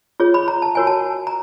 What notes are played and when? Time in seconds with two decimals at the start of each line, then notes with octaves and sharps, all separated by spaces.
0.20 F4 G#4 C#5
0.34 B5
0.48 A#5
0.62 A5
0.75 F#4 A#4 C#5 G#5
0.87 A5
1.27 A#5